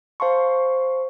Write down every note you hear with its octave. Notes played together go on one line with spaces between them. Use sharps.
C5 F5 A5 C6 C#6